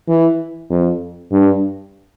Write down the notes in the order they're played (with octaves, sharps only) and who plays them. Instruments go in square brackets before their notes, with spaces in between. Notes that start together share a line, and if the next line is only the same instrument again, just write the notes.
[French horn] E3
F2
G2